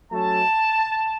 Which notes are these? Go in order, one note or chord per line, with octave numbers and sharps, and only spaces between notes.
F#3 A3 C#4 A5